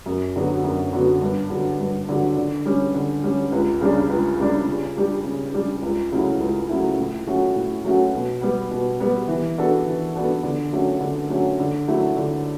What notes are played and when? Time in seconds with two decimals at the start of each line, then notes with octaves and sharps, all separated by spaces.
0.06 F#2
0.36 D3 F#3 B3 F#4
0.64 F#2
0.93 D3 F#3 B3 F#4
1.22 G2
1.50 D3 F#3
1.80 G2
2.09 D3 F#3
2.37 D3
2.65 G3 C#4
2.94 D3
3.23 G3 C#4
3.52 C#2
3.81 C#3 G3 D4
4.10 C#2
4.39 C#3 G3 D4
4.67 C#3
4.97 G3 D4 G4
5.24 C#3
5.54 G3 D4 G4
5.82 C#2
6.12 C#3 F#3 A3 E4
6.40 C#2
6.69 C#3 F#3 A3 E4
6.98 A2
7.27 F#3 A3 C#4 F#4
7.55 A2
7.84 F#3 A3 C#4 F#4
8.14 B2
8.41 G3 B3
8.71 B2
9.00 G3 B3
9.28 E3
9.58 B3 D4 F#4 A4
9.86 E3
10.15 B3 D4 F#4 A4
10.43 D3
10.72 F#3 A3 C#4
11.01 D3
11.30 F#3 A3 C#4
11.59 D3
11.88 F#3 A3 E4
12.17 D3